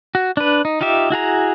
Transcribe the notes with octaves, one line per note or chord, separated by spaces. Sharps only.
F#4
D4 B4
D#4
D#4 F4 G4 E5
E4 F#4 G#4 A#5